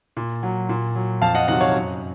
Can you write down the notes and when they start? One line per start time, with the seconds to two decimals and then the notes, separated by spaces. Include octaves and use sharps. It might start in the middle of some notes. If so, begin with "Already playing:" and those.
0.17 A#2
0.43 F#3
0.69 A#2
0.95 F#3
1.22 F2 F5 A5
1.35 D#5 F#5
1.48 C3 D#3 F#3 D#5 F#5
1.61 C#5 F5
1.74 F#2